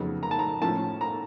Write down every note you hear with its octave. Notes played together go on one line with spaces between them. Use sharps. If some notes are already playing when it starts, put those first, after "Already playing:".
Already playing: F2 C#3 F#3 B3 D#4
A#5
A5
A#5
A2 F3 A3 C#4 A5
A#5